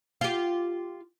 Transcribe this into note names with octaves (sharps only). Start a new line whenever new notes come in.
F4 G4